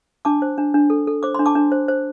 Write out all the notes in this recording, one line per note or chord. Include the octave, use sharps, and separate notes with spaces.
D4 A5 D6
C5
D4
D4
A4
A4
C5 D6
D4 C6
A5 D6
D4
C5
C5